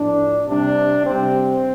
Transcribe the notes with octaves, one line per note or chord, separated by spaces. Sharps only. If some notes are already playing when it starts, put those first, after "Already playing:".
Already playing: A2 F3 D4
C3 G3 D4
C3 G3 C4